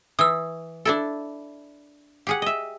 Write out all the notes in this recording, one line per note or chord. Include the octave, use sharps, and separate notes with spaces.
E3 D#6 E6
D4 E4 A4
G4 G#4 F#5
D#5 E5